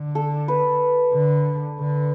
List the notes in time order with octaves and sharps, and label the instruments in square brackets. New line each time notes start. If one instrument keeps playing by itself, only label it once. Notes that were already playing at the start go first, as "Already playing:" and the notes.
Already playing: [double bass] D3
[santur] A4
B4
[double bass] D3
D3